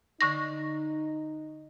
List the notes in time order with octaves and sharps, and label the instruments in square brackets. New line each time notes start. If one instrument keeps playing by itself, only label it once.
[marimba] D3 C#6 A#6 [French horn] D#4